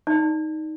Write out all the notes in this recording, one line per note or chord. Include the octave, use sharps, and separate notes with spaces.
D#4 D5
D#4